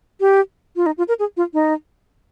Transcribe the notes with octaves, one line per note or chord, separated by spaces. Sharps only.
G4
F4
D#4
F4
A#4
G#4
F4
D#4